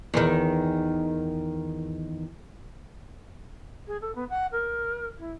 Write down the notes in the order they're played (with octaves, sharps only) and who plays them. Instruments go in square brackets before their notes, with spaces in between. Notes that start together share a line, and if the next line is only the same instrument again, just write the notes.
[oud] E2 D#3
[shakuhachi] G#4
A4
B3
F#5
A#4
E4